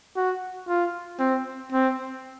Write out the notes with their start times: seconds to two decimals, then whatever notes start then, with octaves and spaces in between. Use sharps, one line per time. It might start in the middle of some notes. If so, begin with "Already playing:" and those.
0.16 F#4
0.68 F4
1.19 C4
1.72 C4